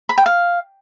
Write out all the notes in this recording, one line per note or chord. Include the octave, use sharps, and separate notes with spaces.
B5
G5
F5